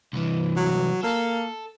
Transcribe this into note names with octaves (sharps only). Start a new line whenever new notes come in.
C2 E3
F#3
A#3 A4